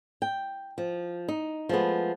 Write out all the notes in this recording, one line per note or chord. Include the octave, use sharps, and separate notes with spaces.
G5
F3
D#4
F3 G#3 A3 B3